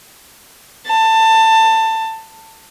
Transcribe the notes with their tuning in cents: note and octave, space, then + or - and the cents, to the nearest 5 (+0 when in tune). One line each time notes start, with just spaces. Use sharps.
A5 +20